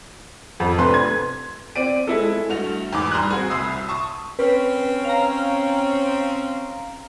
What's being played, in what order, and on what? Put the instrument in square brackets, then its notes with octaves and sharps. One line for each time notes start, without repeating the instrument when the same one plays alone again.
[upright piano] F2
C3 A3 D4 B4 C6
G#6
C4 D5 D7 D#7
G#3 E4 A4
[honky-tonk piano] G2 A3 F#4 F7
E2 G#2 D6
G3 A#5 C6 D#6 F#6 G#6
C4 F#4 G#4
C2 B5 D#6 E6 C7
A5 C#6 D#6
[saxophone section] C4 C#4 [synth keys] B4
[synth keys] F5 A#5